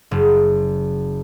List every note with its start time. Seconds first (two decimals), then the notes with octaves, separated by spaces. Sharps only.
0.11 F#1